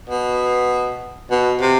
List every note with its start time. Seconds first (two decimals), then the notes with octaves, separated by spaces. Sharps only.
0.09 B2
1.31 B2
1.60 C3